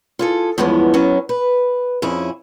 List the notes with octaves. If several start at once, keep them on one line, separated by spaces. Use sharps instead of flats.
F4 G#4 A4
E2 G2 F3 G#3 B3 C#4
F#3 B3 C#4
B4
F2 C#4 E4 G#4